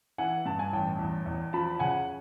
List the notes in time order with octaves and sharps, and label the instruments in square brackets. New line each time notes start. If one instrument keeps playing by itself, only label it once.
[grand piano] E3 F#5 G#5
G2 A5
G#5
A1 G5 A5
E2
E2
F3 A5 B5
C#3 F#5 G#5